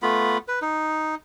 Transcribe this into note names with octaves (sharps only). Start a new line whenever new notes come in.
A3 B3 F4 B5
B4
D#4